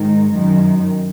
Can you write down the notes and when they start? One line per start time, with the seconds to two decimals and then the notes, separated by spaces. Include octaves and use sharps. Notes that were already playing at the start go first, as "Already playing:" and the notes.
Already playing: G#2 D#3
0.33 F#2 D#3